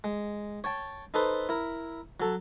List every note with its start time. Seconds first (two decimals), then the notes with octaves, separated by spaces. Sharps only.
0.04 G#3
0.64 C#5 G5 A5
1.14 D#4 A4 B4 C5
1.49 E4 A#4
2.20 F#3 A4